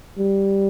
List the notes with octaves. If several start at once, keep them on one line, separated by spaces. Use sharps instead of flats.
G3